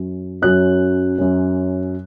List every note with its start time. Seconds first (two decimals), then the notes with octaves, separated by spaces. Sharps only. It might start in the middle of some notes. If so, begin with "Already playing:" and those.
Already playing: F#2 F#3 C#4
0.42 F#2 F#3 C#4 F#6
1.18 F#2 F#3 C#4